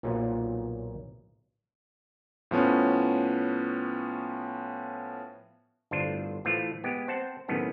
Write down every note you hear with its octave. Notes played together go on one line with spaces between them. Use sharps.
B1 A#2 F3 F#3 A#3
A2 F3 B3 C#4
G1 A2 D4 F4 C5
A2 E3 F3 A3 F4
G#3 B3 G4
C4 C5 F#5 A5
A2 C3 D#3 F#3 B3 C#4